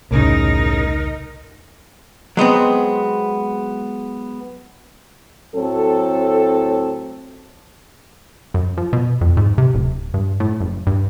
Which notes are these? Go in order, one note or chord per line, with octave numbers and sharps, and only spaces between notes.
E1 C2 A2 C#3 D#4 A#4
F#3 G#3 B3 C4
A2 F#3 C4 A4
F#2
F3
B2
F2
G#2
C3
D1
G2
A2
F#1
G2